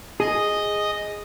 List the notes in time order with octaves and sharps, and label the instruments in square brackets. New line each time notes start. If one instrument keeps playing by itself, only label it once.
[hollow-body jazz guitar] G#4 [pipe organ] D#5 D#6